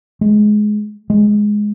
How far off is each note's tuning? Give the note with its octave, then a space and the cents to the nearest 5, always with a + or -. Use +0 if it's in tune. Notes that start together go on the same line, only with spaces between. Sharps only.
G#3 +20
G#3 +5